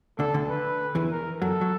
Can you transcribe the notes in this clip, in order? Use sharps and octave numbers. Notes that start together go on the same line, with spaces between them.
D2 D3 A4
D2 D3
B4
E2 E3
A#4
F#2 F#3 A4
F#3